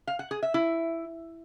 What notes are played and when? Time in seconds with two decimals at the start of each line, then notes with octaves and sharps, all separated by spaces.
0.07 F5
0.19 F#5
0.31 G#4
0.43 E5
0.54 E4